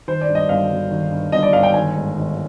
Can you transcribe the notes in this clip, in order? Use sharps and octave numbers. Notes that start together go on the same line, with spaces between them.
D#3 C5
D5
G2
D#5
G1 F5
G1
D#3
G2
G1 D#5
D5
G1 F5
G5
D#3 G#5
G#2
G#1